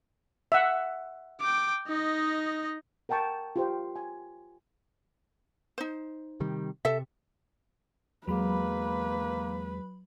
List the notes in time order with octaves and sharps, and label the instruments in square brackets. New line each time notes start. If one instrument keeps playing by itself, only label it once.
[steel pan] E5 F#5
[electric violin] G5 D6
D#4 D#5
[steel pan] A#4 F#5 G5 A5 C#6
F4 G4 C5 G5
G#5
[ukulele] D#4 C5
[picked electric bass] C3 D#3 G3
[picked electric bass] C3 [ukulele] A4 E5
[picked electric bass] E2 G#3 [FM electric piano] F#3 B5 [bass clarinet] A#3 [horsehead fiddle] B4